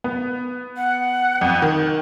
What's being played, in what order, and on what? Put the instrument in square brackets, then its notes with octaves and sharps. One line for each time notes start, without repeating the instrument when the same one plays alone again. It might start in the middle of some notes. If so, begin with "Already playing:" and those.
[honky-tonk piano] B3
[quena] F#5
[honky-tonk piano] F2
D#3